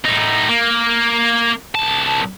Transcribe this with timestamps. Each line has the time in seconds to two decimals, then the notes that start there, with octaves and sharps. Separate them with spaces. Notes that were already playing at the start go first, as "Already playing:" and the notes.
0.05 A2 D#4
0.49 A#3
1.75 C2 A5